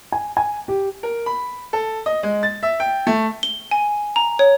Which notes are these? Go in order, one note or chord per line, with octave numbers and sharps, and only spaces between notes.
G#5
G#5
G4
A#4
B5
A4
D#5
G#3
A6
E5
G5
A3
G7
G#5
A#5
C#5